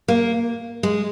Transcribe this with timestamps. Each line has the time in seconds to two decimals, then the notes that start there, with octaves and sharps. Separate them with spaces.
0.08 A#3
0.83 G#3